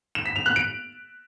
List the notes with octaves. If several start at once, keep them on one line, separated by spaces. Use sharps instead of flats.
E7
B6
F7
F#6
D7